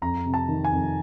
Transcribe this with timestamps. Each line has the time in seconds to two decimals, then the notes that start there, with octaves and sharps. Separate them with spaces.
0.02 F2 A#5
0.25 C3
0.34 A5
0.48 D#3
0.65 G#5
0.72 F2